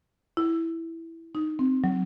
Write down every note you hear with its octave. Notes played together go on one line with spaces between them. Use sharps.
E4
D#4
C4
F#3